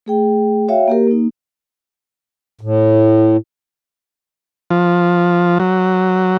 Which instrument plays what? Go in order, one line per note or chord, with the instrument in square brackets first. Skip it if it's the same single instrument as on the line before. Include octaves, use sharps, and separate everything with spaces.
[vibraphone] A3 G#4 G5
F#4 C#5 E5 F5 G5
A#3 G4 A#4
A#3 D#4
[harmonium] A2
[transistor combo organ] F3
F#3